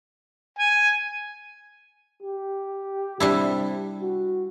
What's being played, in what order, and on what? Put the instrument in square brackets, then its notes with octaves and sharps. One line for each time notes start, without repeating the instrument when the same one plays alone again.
[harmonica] G#5
[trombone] G4
[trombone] C3 [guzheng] G3 D4 E4
[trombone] F#4